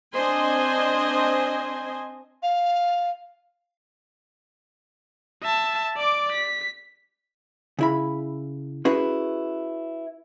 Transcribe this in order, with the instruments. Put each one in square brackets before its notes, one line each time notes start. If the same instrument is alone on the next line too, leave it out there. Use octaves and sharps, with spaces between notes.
[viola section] C4 D4 C5 D#5 G#5 C6
[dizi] F5
[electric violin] E5 A5
D5 D6
B6
[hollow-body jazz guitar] C#3 E4 B5
C#4 E4 F#4 G#4 B4